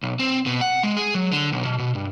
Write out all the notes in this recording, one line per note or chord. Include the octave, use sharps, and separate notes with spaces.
B1
C4
B2
F#5
G#3
G#4
F#3
D3
B1
B2
B2
G2